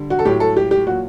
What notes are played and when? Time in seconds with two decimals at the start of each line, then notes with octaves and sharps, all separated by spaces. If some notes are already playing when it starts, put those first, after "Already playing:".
Already playing: D3 G3
0.10 F#4
0.19 A4
0.25 A2 F#3 G4
0.40 A4
0.57 G4
0.71 G4
0.87 A#2 F#3 F#4